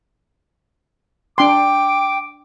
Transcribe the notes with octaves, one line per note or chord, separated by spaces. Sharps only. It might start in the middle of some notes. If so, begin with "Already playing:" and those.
D4 G5 C6 D6